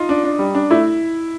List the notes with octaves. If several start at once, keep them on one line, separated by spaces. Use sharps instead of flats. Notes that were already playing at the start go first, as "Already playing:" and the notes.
Already playing: D#4 F4
D4
D4
G3
D4
A3 E4